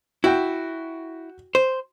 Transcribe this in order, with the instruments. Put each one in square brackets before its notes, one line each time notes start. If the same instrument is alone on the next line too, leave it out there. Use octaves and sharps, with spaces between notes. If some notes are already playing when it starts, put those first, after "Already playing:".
[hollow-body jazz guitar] E4 [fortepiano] F#4 G5
[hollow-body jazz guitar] C5